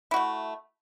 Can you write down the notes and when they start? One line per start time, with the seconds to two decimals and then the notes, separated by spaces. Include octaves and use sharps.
0.11 E4
0.14 F#4
0.16 A3